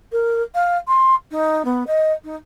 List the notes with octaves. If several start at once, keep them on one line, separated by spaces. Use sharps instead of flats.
A#4
F5
C6
D#4
B3
D#5
D#4